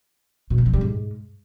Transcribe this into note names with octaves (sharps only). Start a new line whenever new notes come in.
B2
A3
F#3
G3
G#2